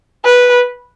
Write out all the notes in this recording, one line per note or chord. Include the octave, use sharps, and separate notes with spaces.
B4